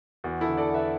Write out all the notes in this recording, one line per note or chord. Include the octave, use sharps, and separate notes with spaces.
E2 F#4
E4 A4
D3
A4 D5
E2
B4 E5